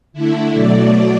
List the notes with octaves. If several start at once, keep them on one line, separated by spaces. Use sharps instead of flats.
D3 A3 E4
B2 F#3 A3 D5